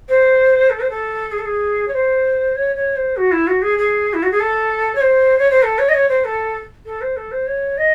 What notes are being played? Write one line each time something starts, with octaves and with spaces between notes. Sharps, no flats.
C5
A4
C5
A4
G#4
A4
G#4
C#5
C5
C#5
C#5
C5
F#4
E4
F#4
G#4
G#4
E4
F#4
G#4
A4
C#5
C5
C#5
C5
A4
C#5
D#5
C#5
C5
A4
A4
C5
A4
C5
C#5
D#5